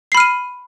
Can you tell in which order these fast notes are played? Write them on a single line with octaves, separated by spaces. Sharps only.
C7 B5 F6 D#7